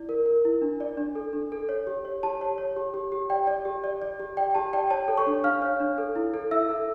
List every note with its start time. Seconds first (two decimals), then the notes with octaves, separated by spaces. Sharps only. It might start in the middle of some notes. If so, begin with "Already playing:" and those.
Already playing: E4 D5
0.09 A#4
0.26 A#4
0.45 E4
0.62 D4
0.80 D5
0.97 D4
1.15 A4
1.33 D4
1.52 A4
1.69 C#5
1.87 G4
2.05 C#5
2.23 G4 A5
2.41 C#5
2.58 C#5
2.76 G4
2.94 G4
3.12 G4
3.30 D5 G5
3.47 D5
3.65 G4
3.84 D5
4.02 D5
4.20 G4
4.37 D5 G5
4.55 G4 A5
4.73 D5 G5
4.90 C#5 A5
5.08 A4
5.17 C#5 C#6
5.27 D4
5.44 D4 F5 F6
5.62 C#5
5.80 D4
5.98 A4
6.16 E4
6.34 A4
6.51 E4 E5 E6
6.69 A4